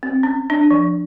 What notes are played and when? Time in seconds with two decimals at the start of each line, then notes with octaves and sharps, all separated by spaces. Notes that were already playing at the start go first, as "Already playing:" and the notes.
0.03 C4
0.23 C#4
0.50 D4
0.71 F3